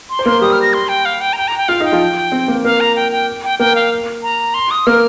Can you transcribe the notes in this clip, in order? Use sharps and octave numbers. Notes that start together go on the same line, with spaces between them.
C6
C5
A#3 A#4 C6
G3 G4 D#6
F6
A#6
C6
G5
F5
G5
A#5
G5
A#5
G5
F4 F5
D#4 G5
F3 F4
C4
A#3
A#3 A#4 F5
A#5
G5
G5
G5
A#3 A#4 G5
F5
A#5
C6
D#6
A#3 A#4 F6